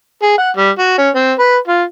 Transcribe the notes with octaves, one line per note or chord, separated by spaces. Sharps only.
G#4
F#5
G3
F#4
C#4
C4
B4
F4